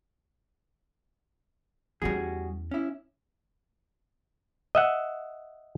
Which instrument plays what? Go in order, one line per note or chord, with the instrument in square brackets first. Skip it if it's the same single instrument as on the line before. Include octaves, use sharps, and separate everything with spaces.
[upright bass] E2 C#4 [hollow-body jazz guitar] G3 F#4 G#4
[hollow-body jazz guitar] C#4 E4
[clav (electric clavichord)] D#5 E5 F#5